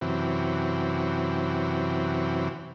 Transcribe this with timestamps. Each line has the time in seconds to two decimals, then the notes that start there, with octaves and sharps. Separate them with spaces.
0.01 F#2 C3 E3